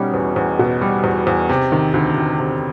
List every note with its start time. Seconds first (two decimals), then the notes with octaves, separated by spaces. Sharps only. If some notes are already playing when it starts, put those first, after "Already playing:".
Already playing: B2 G3 C#4 D#4
0.14 E2
0.36 E2
0.59 B2
0.82 G3
1.04 E2
1.27 E2
1.49 C3
1.72 D#3
1.94 D2
2.16 D2
2.39 C3